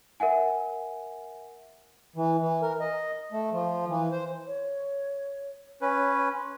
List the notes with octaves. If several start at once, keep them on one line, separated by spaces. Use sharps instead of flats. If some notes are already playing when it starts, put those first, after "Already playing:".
A#4 E5 F#5 G#5
E3
E3
A#4
D#5
A3
F3
E3
C5
C#5
C#4 B4 C#5
C6